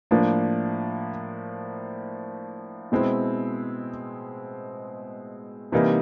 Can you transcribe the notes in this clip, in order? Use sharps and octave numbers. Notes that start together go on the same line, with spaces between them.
A2 F3 A#3 D4
B2 G#3 C4 E4
C3 E3 G3 A#3 D#4